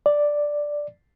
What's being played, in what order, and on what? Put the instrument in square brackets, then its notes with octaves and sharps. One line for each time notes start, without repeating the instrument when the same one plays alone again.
[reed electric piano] D5